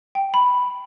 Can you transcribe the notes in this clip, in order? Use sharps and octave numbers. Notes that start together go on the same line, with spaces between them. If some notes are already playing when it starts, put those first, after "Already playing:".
G5
B5